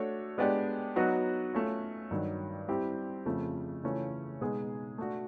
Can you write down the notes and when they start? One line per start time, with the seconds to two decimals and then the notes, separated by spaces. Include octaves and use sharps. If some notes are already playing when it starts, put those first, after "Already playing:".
Already playing: A3 D4 F#4 A4 C#5
0.38 G#3 B3 D4 G4
0.96 F#3 B3 D#4 F#4
1.53 A3 C#4 F4
2.11 G2 D#3 F#3
2.68 G3 C4 E4 G4
3.25 F2 C#3 F3 A3
3.83 C#3 E3 A3 C#4 F4
4.41 B2 G#3 B3 D#4 G#4
4.98 A3 D4 F#4